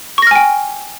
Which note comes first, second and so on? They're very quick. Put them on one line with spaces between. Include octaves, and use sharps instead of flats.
C#6 A#6 F6 G#5 G5